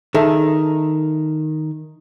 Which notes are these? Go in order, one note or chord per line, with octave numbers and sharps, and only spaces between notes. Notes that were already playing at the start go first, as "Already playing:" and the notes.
D#3 G#4 A4 E5